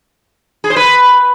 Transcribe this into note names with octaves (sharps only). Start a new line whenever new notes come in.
G#4
C5
B4